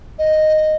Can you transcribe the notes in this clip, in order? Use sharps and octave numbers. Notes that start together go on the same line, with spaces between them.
D#5